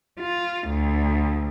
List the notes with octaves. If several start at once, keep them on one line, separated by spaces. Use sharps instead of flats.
F4
D2